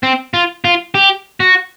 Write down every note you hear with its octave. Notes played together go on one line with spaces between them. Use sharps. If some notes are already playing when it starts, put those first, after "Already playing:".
C4
F4
F4
G4
F#4